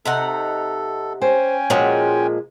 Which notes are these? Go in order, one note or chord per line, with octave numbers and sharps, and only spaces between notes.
C3 D#4 A4 F#5
C#4 C5 G5 G#5
A#2 F3 G#3 F#4 C#5